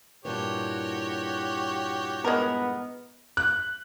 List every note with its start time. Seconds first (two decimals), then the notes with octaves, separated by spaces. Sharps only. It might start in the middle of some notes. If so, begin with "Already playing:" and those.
0.25 G2 A#2 E3 F#4 G4 C#5
2.25 G#3 B3 A#4
3.37 F#6